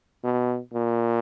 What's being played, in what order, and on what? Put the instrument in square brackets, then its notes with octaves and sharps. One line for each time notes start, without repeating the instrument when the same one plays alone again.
[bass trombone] B2
A#2